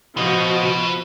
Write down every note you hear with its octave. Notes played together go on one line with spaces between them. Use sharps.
F3 B3 F#4 D#5